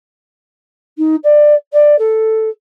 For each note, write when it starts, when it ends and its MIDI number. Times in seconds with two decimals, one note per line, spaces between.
0.98 1.15 63
1.23 1.54 74
1.72 1.98 74
1.98 2.49 69